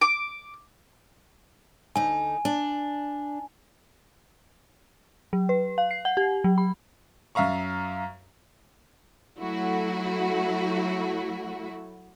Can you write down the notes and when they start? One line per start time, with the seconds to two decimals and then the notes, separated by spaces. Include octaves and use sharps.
0.01 D6
1.96 D2 D#4 G#5
2.45 D4
5.33 F#3
5.49 B4
5.78 F5
5.91 C7
6.05 F#5
6.17 G4
6.44 F#3
6.58 B5
7.35 F#2 E5 F5 A#5 C#6
9.39 F#3 A3 E4 F#4